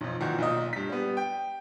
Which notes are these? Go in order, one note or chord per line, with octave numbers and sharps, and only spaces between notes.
B1 F2
A#2 D#3 E3 F#4
B1 A#2 D#5
G2 B6
G3 B3
G5